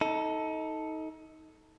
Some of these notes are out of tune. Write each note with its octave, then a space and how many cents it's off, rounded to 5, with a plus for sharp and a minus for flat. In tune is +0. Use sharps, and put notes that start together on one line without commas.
D#4 +25 A4 +0